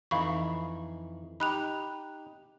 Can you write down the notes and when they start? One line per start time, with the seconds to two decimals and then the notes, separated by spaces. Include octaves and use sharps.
0.11 F2 E3 D#4 F5 B5 C#6
1.40 D#4 G4 B5 F#6 F7